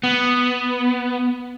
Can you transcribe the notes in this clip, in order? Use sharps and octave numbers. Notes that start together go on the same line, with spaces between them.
B3